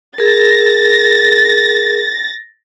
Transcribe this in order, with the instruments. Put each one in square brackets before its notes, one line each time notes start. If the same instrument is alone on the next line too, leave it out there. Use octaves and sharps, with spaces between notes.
[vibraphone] G#4 A#4 [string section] A6 A#6